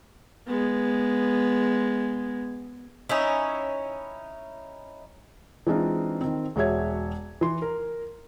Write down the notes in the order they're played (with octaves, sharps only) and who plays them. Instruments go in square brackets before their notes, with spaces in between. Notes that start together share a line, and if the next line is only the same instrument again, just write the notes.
[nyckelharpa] G#3 B3
[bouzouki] C#4 D#4 E4
[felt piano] E3 G#3 C4 D4 D#4 F4
D#3 C4
E1 F#4 G#4 C#5 E5 G#6
E3 C6
A#4